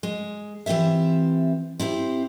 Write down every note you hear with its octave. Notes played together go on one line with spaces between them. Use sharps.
G#3
E3 C4 F4 G4 E5
C4 E4 G4 C5